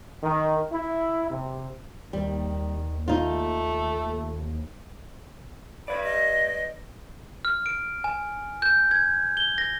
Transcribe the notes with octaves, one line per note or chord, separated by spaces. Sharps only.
D#3
E4
C3
D#2 D#3 G3
A3 D#4 F4
B4 D5 B5
D#5
F6
D7
G#5
G6
G#6
G7
A#6